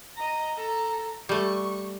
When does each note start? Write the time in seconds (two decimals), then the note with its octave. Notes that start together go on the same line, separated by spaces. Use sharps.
0.15 D#5 A#5
0.56 A4 A#5
1.29 G3 A3 C#6